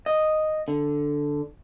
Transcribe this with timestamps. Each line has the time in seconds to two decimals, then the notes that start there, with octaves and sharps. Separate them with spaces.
0.06 D#5
0.68 D3